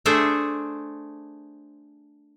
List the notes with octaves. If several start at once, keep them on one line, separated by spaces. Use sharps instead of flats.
A3 D4 G#4 C5